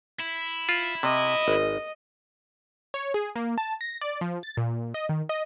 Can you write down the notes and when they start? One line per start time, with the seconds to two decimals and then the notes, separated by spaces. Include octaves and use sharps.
0.20 E4
0.69 F4
1.03 C3 D#5
1.48 G#1
2.94 C#5
3.14 G#4
3.36 A#3
3.58 A5
3.81 A#6
4.01 D5
4.21 F3
4.43 A6
4.57 A#2
4.94 D#5
5.09 D#3
5.29 D#5